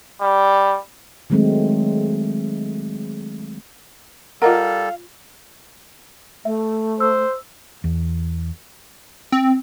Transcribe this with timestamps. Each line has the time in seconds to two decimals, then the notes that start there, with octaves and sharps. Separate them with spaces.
0.21 G3
1.30 D#3 F#3 G#3 A3 C4
4.42 G3 F4 A4 A#4 D#5 F5 F#5
6.45 A3 E5
7.00 C5 E6
7.84 E2
9.32 C4